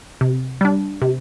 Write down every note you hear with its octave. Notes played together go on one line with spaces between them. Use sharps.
C3
G3 D4
C3